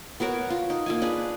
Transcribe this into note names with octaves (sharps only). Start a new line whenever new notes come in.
B3 F#4 A#4 C#5
F4
D#4
A#3 F4 G#5
D4 G#4 B4